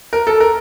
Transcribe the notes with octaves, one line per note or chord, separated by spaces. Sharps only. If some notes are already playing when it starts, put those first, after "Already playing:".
A#4
A4
A#4